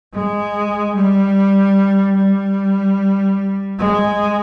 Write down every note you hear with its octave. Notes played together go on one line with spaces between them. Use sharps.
G#3
G3
G3
G#3